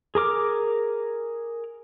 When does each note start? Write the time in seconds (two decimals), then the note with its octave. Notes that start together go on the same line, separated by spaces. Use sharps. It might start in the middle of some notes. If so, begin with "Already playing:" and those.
0.15 G#4 A#4 D6 F6